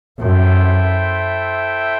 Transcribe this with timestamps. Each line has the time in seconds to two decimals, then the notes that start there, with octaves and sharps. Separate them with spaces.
0.19 F#2 E4 A4 C5 E5 G5